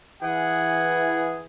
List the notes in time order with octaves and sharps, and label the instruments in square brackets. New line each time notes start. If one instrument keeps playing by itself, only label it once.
[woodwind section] E3 G#4 [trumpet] F#5